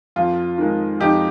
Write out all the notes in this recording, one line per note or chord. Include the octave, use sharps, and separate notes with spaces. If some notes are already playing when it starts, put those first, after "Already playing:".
F2 F4
D#3 G#3
F2 D#4 G4